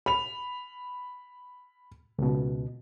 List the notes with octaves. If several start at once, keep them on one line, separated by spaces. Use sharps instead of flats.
B5 F7
C#2 B2